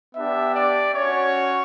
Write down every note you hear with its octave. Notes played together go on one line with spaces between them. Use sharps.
B3 D4 G4 E5
D5
C#4 F#4 C#5